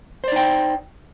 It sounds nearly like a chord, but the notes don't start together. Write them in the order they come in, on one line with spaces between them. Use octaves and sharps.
C5 D5 D#4 G5